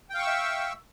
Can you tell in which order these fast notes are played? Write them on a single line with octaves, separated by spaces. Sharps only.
G5 F5 C#6 E6 E5